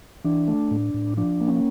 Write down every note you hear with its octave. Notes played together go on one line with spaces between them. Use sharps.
E3 D4
A3
A2
A2
F3 D4
A#3
C#4